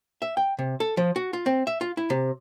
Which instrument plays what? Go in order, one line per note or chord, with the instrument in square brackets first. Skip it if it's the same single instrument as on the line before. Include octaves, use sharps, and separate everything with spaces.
[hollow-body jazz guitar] E5
G5
C3
A4
F3
F#4
F4
C4
E5
F4
E4
C3